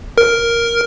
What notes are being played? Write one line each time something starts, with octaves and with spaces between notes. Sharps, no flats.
A#4